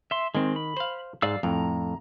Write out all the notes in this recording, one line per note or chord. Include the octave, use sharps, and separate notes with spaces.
E5 C6
D#3 G#3 C4
B5
C5 F5
G#2 D5 F5 E6
F2 A2 A#5